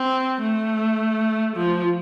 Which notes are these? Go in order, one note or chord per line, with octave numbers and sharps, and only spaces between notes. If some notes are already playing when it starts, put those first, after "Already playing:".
Already playing: C4
A3
F3